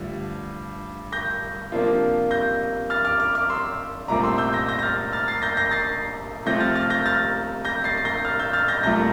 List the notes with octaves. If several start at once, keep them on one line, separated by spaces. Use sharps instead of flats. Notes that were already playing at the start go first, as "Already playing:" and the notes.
Already playing: G2 D3 F3 A3
G6 A#6
C3 F3 A#3 D4 F4
G6 A#6
F6 A6
D6 F6
D6 F6
D6 F6
C6 E6
C2 A#2 A3 C4 A#5 D6
C6 E6
E6 G6
G6 A#6
G6 A#6
A#6
F6 A6
F6 A6
A6 C7
G6 A#6
G6 A#6
A6 C7
C3 F3 A3 C4 F4 G6 A#6
F6 A6
F6 A6
G6 A#6
F6 A6
G6 A#6
A6 C7
C7
G6 A#6
F6 A6
E6 G6
F6 A6
G6 A#6
C2 A#2 A3 G6 A#6